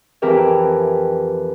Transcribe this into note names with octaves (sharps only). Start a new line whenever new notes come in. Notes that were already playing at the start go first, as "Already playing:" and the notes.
F2 E3 G4 A#4 E5 G5